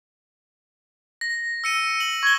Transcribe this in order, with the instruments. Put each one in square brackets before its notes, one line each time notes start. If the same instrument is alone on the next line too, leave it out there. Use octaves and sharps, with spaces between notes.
[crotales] A#6
E6 C#7 D#7
F#7
[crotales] C#6 G7 [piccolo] G#6